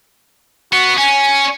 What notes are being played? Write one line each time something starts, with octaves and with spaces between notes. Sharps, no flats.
B3 F#4
C#4 G#5